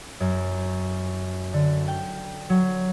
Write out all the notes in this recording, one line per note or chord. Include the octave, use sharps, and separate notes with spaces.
F#2
D3
G5
F#3